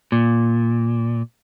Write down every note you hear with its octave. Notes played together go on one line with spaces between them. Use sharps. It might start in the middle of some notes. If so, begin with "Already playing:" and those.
A#2